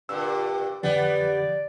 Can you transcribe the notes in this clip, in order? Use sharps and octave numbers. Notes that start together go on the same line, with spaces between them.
G2 A#2 D3 E6
F2 D3 F3 G3 B3 D5